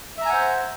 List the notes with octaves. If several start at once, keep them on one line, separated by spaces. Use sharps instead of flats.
C5 E5 F#5 G#5 A#5